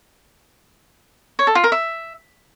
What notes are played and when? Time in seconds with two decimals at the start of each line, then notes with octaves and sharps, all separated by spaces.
1.39 C#5
1.47 A4
1.55 F4
1.64 A#4
1.72 E5